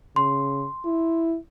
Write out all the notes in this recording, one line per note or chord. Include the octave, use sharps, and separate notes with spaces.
C#3 C6
E4